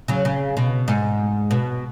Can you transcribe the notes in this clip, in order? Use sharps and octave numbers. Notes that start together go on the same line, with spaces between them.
C#3 F#3
C#3
B2
G#2
B2